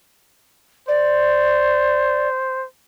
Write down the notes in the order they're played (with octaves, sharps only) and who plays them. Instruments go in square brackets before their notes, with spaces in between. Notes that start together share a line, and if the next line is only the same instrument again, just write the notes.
[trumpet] C5 [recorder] D5